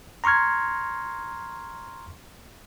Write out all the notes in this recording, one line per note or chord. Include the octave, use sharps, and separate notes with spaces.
A#5 C6 C#6 F6 G#6